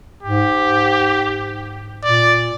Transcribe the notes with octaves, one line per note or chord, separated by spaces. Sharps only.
G#2 G4
A#2 D5